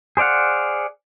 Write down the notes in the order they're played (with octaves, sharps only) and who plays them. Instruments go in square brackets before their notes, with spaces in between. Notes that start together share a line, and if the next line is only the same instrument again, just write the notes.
[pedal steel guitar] G#4 C5 D5 F5 F#5